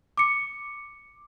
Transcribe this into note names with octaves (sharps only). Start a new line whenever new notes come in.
D6 C#7